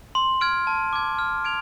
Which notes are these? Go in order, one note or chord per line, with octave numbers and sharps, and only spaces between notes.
C6
F6 G#6 D7
A5
D6 G#6
F6
G#6 D7 F7